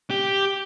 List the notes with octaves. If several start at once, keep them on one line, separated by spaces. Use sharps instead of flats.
G4